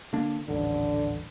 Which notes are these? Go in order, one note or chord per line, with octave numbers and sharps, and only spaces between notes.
D3 A#3 D4
D#1 A1 D3